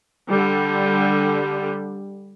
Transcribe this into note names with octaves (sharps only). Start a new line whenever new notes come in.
D3 G3